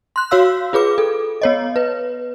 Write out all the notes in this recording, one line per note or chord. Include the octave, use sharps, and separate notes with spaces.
C6 F#6
F#4 C#5 F5 E6
F4 G#4 B4 D6
A4
B3 C#5 D#5
B4